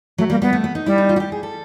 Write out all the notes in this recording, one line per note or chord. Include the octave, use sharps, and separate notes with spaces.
F#3 A3
G3 A#3
G3 B3
A3
B3
D#4
G3 E4
D#4
F4
F#4
G4
G#4
A4